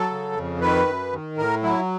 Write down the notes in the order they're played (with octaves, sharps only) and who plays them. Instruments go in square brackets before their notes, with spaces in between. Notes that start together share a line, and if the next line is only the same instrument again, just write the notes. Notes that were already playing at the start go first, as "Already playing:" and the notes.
Already playing: [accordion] F#3 A4
C#3
F2
D#3 B4
F#2
D#3
A2 A#4
F#3 E4